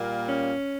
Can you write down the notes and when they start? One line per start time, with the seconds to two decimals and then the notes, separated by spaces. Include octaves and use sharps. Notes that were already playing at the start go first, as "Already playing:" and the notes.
Already playing: A#2 G3 A#3
0.28 C#4